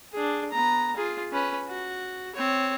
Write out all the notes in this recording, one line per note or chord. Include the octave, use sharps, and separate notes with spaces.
D4 G#4
B3 A#5
F4 G#4
C#4 B4
F#4
C4 C#5